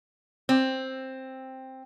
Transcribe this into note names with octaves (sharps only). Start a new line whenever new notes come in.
C4